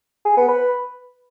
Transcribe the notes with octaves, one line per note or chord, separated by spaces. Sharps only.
G#4
B3
B4